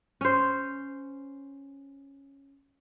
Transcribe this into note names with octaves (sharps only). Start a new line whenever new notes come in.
C#4 C5